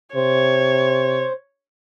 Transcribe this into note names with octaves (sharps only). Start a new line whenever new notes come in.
C3 C5 C#5